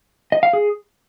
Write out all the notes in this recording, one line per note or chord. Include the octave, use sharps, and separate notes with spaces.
D#5
F5
G#4